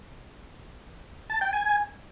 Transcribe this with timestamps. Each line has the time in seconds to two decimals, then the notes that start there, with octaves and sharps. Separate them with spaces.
1.30 A5
1.41 G5
1.53 G#5